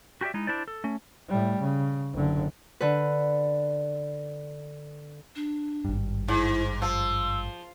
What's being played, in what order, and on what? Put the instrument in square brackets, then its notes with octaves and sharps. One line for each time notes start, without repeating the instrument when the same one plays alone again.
[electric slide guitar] F#4 G4 A#4 D5 E5
G#3 D#4 E4
D4 E4 C5 D5
A4
A3 C#4
[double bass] A2 G3
C#3
F#1 D3
[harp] D3 B4
[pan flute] D4
[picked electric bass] G#1 G2
[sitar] G#2 [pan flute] E4
[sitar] F3 [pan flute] E6